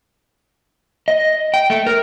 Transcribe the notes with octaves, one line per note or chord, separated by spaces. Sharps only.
D#5
G5
A3
A#4